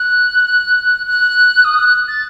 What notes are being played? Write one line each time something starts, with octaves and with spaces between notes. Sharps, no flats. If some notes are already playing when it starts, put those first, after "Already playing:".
Already playing: F#6
F#6
D#6
F#6
A6